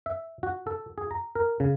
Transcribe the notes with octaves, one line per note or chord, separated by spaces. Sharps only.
E5
F#4
A4
G#4
A#5
A#4
C#3